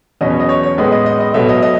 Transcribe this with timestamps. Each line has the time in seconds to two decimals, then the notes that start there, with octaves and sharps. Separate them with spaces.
0.21 E2 B2 F#3 C#4 D#5
0.30 C#5
0.40 D#5
0.49 C#5
0.63 C#5
0.78 A2 G#3 B3 D#5
0.92 D#5
1.06 D#5
1.20 D#5
1.34 B2 F#3 A3 E5
1.49 D#5
1.62 D#5